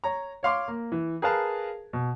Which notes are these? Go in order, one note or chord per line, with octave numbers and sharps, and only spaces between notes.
C#5 A#5
C#5 F5 C6 D6
A#3
E3
G#4 A#4 B4 F5 A5
B2